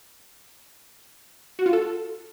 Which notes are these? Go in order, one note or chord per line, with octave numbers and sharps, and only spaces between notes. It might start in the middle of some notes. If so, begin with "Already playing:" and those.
F#4
F4
A4